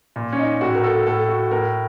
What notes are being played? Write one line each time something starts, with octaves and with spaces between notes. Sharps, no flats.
A#2
C#4
D#4
A2 F#4
A#4
A4
A2 A4
F#4
A2 A#4